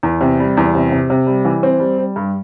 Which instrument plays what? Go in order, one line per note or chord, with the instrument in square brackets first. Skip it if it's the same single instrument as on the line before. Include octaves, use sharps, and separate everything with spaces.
[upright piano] E2
C3
G3
E2
C3
C3
C3
G3
E3
C4
G3
G3
G2